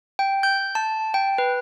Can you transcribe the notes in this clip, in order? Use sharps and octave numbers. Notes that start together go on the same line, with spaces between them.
G5
G6
A5
G5
B4